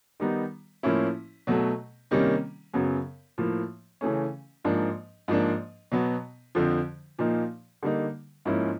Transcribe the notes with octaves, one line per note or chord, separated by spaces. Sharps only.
D#3 G3 B3 D#4
A2 F3 A#3 C#4 E4
B2 F#3 A3
C3 D#3 G3 A#3 C#4
F#2 C#3 F#3 B3
A2 F3 A#3
C#3 E3 A3 C#4
G#2 F3 A#3 D4
G#2 F3 A#3 D4
B2 F#3 B3
F2 D3 F3
A#2 F3 A#3 D#4
D3 G3 A#3 D#4
G#2 F3 A#3 C#4 E4